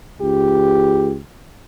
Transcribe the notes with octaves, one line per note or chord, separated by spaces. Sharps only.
C#2 G4